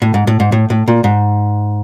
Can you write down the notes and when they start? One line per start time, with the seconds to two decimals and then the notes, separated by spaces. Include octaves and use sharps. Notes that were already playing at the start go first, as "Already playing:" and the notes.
0.02 A2
0.14 G#2
0.27 A2
0.40 G#2
0.52 A2
0.70 A2
0.88 A#2
1.04 G#2